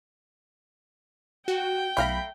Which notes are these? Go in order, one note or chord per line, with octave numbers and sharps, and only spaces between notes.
F#4 G5
B1 A3 F5 A#5 B5